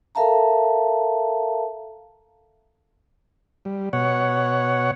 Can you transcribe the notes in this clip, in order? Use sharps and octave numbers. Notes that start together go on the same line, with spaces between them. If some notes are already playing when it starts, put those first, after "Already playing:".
A4 A#4 E5 F5 A5 A#5
G3
B2 C#5 F#5